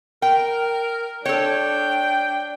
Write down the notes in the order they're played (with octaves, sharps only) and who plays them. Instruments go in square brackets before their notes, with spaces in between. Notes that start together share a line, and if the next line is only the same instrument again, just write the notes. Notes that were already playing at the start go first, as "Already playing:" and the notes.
[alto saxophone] A#4 [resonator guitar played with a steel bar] G5
[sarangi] D4 [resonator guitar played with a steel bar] A4 C#5 [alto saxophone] G5